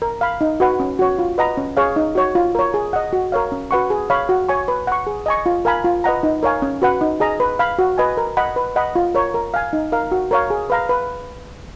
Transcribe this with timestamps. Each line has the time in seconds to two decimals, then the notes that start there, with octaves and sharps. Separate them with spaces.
0.02 A#4
0.21 F5 B5
0.41 D#4
0.60 F#4 B4 F#5
0.80 C#4
0.99 F#4 C#5
1.19 F4
1.38 B4 D#5 F#5 A#5
1.57 C#4
1.77 G#4 C#5 F5
1.96 D#4
2.15 F#4 C#5
2.35 F4
2.55 A#4 C#5
2.74 G#4
2.93 D#5 F#5
3.13 F#4
3.32 A#4 C#5 F5
3.52 C#4
3.71 F#4 B4 F#5 C#6
3.90 G#4
4.10 C#5 F5 B5
4.29 F#4
4.49 C#5 G#5 C#6
4.68 B4
4.87 F#5 C#6
5.07 G#4
5.26 D#5 G#5 C#6
5.46 F4
5.65 A#4 F5 G#5 B5
5.84 F4
6.04 B4 D#5 F#5 A#5
6.23 D#4
6.43 A#4 C#5 F5 G#5
6.62 C#4
6.82 F#4 B4 F#5
7.01 D#4
7.20 G#4 D#5 A#5
7.40 B4
7.59 F5 B5
7.79 F#4
7.98 B4 D#5 G#5
8.17 A#4
8.37 D#5 F#5 B5
8.56 B4
8.76 D#5 F#5 B5
8.95 F4
9.15 A#4 C#5
9.34 A#4
9.54 F5 G#5
9.73 D#4
9.92 A#4 F5
10.12 F#4
10.31 A#4 C#5 F5
10.50 G#4
10.70 B4 F5 A#5
10.89 B4